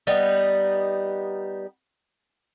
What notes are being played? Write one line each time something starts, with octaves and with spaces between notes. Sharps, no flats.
G3 B3 D#4